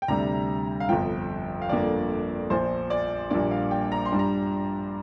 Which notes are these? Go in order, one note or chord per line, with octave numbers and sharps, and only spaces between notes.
G5
D2 C3 G3 D4 A#5
F5
G1 F2 F3 G5
F5
G1 F2 D3 A#3 D5
A#1 A#2 F3 C5
D5
A#1 A#2 G3 A#3 D4 D5
F5
G5
A#5
C6
G2 G3 D4
A#5